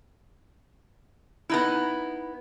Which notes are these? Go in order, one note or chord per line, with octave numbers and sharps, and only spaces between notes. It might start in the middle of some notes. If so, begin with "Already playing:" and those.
B3 D#4 E4